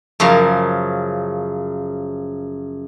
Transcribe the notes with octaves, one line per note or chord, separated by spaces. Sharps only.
F#2 C#3 F3 A#4 F5